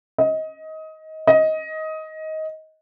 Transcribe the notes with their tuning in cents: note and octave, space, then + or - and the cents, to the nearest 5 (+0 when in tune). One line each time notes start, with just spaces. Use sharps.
D#5 +20
D#5 +15